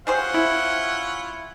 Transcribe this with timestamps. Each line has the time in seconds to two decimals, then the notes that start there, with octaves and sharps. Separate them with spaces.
0.07 G3 C#4 F4 G#4 C5 F#5
0.34 E4